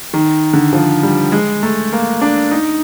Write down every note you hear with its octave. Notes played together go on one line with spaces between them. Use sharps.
D#3
D3
F3
G3
G#3
A3
A#3
D4
D#4